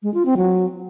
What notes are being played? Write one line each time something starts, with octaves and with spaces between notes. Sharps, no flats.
G#3
F4
C4
F#3